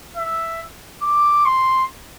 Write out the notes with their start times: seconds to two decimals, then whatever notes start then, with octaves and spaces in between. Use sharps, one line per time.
0.17 E5
1.02 D6
1.46 C6